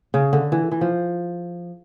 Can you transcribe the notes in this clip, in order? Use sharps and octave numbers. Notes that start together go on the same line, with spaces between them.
C#3
D3
E3
E3
F3